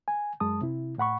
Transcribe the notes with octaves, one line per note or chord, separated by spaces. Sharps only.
G#5
F#2 G#3 A5 D#6
C3 E4
A2 F#5 B5 C#6